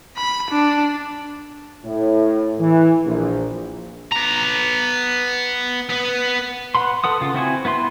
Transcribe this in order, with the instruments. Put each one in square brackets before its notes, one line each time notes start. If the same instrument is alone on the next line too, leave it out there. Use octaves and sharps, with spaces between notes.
[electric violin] B5
D4
[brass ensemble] A2
E3
A#1
[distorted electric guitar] B3 A#5
B3 B4
[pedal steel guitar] B4 F#5 B5 C6
A4 B4 F#5 D#6
C#3 F4
C4 E4 F#4 G#5
B3 E4 B4 C6